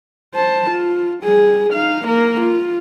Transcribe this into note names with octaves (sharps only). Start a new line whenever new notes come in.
C5 A5
F4
G3 G#4
D#4 F5
A#3 A#4
F4